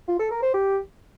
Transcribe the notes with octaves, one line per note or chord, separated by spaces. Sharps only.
F4
A4
A#4
C5
G4